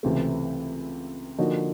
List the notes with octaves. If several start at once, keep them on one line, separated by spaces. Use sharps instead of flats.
C#2 C3 E3 A3
D3 F3 A#3 D#4 F#4